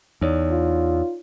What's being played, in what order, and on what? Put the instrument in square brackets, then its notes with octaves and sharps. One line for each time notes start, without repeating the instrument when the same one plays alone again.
[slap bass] E2 [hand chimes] D#4 C#5 D5
[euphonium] F4